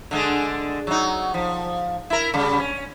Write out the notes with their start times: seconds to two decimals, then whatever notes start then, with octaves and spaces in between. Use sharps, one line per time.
0.11 D3 G#3 D4
0.87 F#3 D#4
1.34 F3
2.10 E4 A#4
2.34 C#3 G3
2.60 C#4